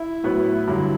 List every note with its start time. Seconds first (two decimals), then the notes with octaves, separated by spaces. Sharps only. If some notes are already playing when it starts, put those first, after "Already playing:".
Already playing: E4
0.23 A2 F#3 B3 F#4 B4
0.67 G2 D3 F#3 E4